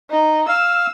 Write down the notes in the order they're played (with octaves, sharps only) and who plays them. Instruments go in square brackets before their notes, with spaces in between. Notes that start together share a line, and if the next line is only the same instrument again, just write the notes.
[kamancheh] D#4
[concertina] F5 [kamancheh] E6